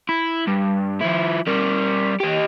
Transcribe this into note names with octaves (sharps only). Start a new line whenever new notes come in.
E4
G2
F3 E4
G3 A#4
G4 D#5